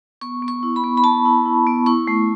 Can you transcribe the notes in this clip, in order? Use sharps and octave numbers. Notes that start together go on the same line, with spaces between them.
B3 C#6
B3
C#6
E4
B5
B3
B5
B3 A5
E4
E4
B3
E4 C#6
A3